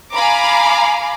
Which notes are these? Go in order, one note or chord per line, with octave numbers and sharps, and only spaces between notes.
F5 G#5 A#5 B5 D6